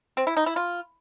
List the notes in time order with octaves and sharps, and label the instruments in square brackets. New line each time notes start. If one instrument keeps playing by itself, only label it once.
[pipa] C4
E4
D#4
E4
F4